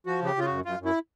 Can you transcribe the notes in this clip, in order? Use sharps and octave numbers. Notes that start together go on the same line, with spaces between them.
F3 F#4
C#3 G4
C#3 F4
F#2 F#4
F#2 F4
F#2
E4